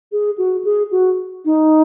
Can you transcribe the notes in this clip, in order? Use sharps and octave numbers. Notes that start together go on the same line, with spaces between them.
G#4
F#4
G#4
F#4
D#4